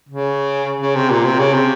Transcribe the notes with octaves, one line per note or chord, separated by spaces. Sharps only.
C#3
C#3
C3
A#2
C3
C#3
C3